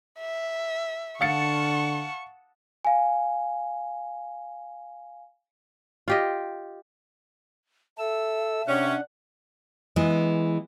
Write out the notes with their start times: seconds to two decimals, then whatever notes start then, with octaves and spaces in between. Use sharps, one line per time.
0.19 E5
1.21 D3 F5 F#5 A5 C#6 A6 C#7
2.85 F5 G#5
6.08 F4 G4 D#5
7.98 A4 E5 E6
8.67 C3 C#4 D4 F#5
9.96 E3 G#3 B3